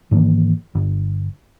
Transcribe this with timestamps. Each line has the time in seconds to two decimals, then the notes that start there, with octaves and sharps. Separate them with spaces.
0.11 G#2 D#3 E3 A#3
0.75 G1